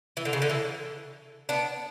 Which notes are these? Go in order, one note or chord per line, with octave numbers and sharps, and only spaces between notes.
E3
D3
C#3
D3
E3
B3 D4